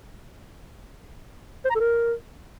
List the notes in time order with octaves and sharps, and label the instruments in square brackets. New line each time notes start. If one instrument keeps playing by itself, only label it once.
[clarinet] C5
A#5
A4
A#4